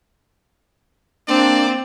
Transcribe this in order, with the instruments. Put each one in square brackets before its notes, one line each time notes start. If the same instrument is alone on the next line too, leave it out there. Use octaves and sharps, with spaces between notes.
[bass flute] A#3 [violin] C4 [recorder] D4 [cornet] D5